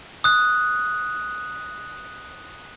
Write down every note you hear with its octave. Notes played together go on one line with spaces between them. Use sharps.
D#6 F#6